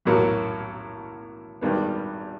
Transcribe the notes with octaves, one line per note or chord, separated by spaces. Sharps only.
B1 A2 F#3 A#3
G#1 G2 D#3 G3 B3